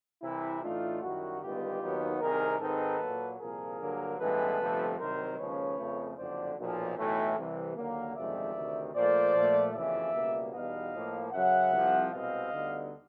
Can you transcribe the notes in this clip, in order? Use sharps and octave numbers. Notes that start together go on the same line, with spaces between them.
C2 C3 E3 E4
A2 E3 A3 D4 D#4 F4
F#2 D#3 G3 E4 F#4
G1 G2 D#3 G#3 B3 F4 G4
D#2 D#3 F#3 B3 D#4
C2 C3 D#3 G#4 A#4
G#2 D#3 G#3 C4 D#4 A4 B4
A#2 F#3 A#3
C2 A#2 F3 G#4 A#4
G2 D3 F#3 A#3
A1 G2 E3 G#3 B3 A4 B4
G1 F2 C3 F3 A3
C2 C3 D#3 F#3 A#4 C5
D#2 C#3 F3 G#3 C#4 B4 C#5
F2 C#3 F3 A3
F#1 F2 D3 C5 D5
B1 A#2 F3
B1 A2 E3 A3
C2 C3 E3
D#2 D3 F#3 A#3
G1 F2 C3 D#3 G#3 D5 E5
D2 C3 D#3
A#2 F3 A3 C5 D5
A#2 F3 A3
F#1 F2 C#3 E3 D5 E5
C#2 B2 G3 A#3
E2 B2 G3 B3 D#4 D#5 F5
A2 F3 A#3
F#2 C#3 F#3 E5 F#5
C2 C3 F3
C2 B2 G#3 C4 D#5 F5
D2 D3 G3 B3 D#4